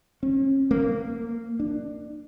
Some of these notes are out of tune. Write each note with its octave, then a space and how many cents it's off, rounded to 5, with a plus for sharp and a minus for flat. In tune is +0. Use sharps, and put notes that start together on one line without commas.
C#4 -35
A#3 -20
D4 +25